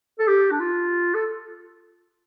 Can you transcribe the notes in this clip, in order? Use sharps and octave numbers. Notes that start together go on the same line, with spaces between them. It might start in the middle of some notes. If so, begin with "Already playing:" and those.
A4
G4
D4
F4
A4